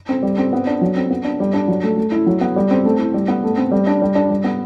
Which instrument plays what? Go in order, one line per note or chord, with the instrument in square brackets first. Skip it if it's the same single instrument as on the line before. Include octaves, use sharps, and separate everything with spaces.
[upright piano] C4
G3
C4
B3
D4
F#3
C4
B3
D4
G3
D4
F#3
A3
A3
E4
F#3
B3
G3
C4
A3
E4
G3
B3
A3
C4
G3
D4
G3
D4
G3
B3